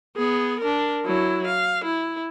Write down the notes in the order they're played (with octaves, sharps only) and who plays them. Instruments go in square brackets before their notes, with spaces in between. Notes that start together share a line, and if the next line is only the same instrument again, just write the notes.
[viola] B3 G#4
D4 A#4
F#3 E4
F5
E4